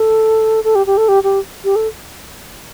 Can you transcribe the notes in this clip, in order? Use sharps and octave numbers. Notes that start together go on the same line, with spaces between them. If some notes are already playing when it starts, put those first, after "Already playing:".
Already playing: A4
A4
G4
G4
A4
G4
G4
G4
A4